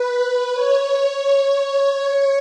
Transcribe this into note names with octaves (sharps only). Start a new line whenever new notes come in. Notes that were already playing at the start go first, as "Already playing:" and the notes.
Already playing: B4
B4
C#5